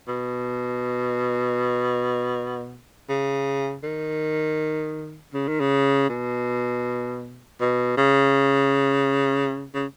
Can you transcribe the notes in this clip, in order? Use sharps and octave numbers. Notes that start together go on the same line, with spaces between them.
B2
C#3
D#3
C#3
D#3
C#3
B2
B2
C#3
C#3